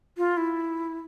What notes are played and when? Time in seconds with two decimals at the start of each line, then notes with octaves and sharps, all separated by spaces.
0.18 F4
0.37 E4